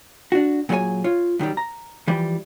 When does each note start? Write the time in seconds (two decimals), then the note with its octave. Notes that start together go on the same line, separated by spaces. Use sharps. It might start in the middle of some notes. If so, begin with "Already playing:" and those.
0.32 D4 F#4
0.69 A#2 F#3 G#4 C5 C#5 G#5
1.04 F4 C#5
1.39 F#2 D#3 F#3 G3
1.57 A#5
2.08 E3 F3 G3